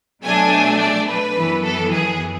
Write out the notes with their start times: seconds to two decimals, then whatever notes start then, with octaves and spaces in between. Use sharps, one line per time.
0.23 B2 F#3 A3 D4 G#5
0.79 D5
1.09 B4
1.36 F#2 E3 B3
1.65 A4
1.93 G#4